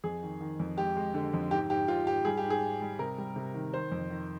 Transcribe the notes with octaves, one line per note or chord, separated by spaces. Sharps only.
F2 G#4
D#3
D#3
F2
G#3 G4
G#3
D3
F2
G#2 G4
G#2 G4
G#2 F4
G#2 G4
G3 G#4
G4
G#2
G#4
G#2
G3
C3 A#4
G3
C3
D#3
D#3 C5
F2
D#3